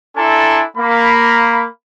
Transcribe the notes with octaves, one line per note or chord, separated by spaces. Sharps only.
D4 E4 A4 G#5 A#5 C6
A#3 B5